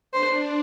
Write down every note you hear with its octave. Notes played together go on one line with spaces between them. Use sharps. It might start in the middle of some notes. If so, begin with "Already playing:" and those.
D4 C5